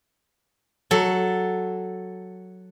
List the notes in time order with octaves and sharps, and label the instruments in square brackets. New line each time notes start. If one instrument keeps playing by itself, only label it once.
[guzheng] F#3 A4